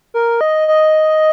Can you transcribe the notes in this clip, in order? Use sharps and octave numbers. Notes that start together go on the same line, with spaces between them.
A#4
D#5
D#5